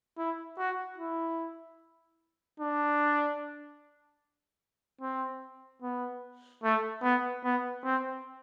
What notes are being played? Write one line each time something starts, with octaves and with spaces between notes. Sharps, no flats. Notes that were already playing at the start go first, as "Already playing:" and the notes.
E4
F#4
E4
D4
C4
B3
A3
B3
B3
C4